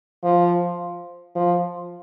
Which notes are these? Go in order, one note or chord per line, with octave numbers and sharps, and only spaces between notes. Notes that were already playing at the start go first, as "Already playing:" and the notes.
F3
F3